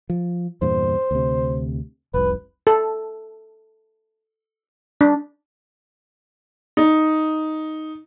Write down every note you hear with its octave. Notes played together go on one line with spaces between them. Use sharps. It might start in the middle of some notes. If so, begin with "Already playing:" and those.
F3
E2 G2 A#2 C5
D2 C3
F1 C2 B4
A4
D4
D#4